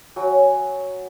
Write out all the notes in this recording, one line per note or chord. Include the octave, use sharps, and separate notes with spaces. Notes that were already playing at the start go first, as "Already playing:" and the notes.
F#3 G5 G#5